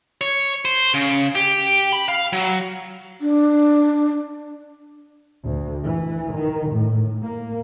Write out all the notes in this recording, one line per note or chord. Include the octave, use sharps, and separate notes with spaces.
C#5
C5
C#3
G4
B5
F5
F#3
D4
D2
E3
D#3
A2
A#3